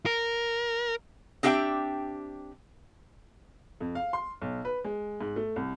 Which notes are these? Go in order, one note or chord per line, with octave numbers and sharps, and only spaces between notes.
A#4
C4 D4 G4 E5 F5 G5
F2
F5
C6
B1
B4
G#3
G#2
A3
C2